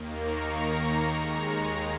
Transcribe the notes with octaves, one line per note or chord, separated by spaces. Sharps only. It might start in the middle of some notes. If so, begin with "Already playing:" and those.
Already playing: D#2 D#3 A#3
A#5 C#6
D#2 D#3 G#3